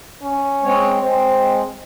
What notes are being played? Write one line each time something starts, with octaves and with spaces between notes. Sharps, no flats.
C#4
G#3 C4 C#5
G#3 C4